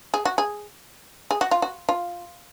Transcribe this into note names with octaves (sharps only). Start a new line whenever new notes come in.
G#4
F#4
G#4
G#4
F#4
F4
F#4
F4